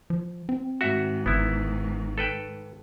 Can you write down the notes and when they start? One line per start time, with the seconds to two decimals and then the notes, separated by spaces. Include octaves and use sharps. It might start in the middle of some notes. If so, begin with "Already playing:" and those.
0.10 F3
0.49 C4
0.81 G#2 D#3 F#4 E5
1.26 G1 B3 E4
2.18 A4 B4 G5